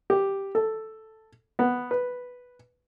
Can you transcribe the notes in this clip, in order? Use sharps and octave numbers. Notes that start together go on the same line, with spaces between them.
G4
A4
B3
B4